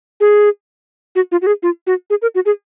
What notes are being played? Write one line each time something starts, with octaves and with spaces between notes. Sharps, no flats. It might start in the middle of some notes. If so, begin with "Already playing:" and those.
G#4
F#4
F4
F#4
G#4
F4
F#4
G#4
A#4
F#4
G#4